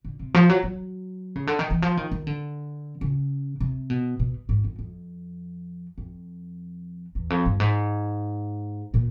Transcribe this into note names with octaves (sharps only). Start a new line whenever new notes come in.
D3
C3
F3
F#3
F#3
C#3
D3
D#3
E3
F3
D#3
D#3
D3
C#3
C3
B2
B2
G#2
F2
F2
F2
E2
F2
G2
G#2
A#2